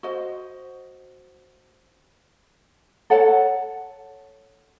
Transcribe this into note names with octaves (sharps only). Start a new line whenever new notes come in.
F#4 C5 D#5
A4 C#5 F#5 A5